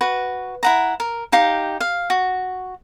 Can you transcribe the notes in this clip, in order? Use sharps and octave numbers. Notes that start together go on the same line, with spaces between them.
F#4 B4
E4 F#5 A#5
A#4
D#4 G4 F5 D6
F5
F#4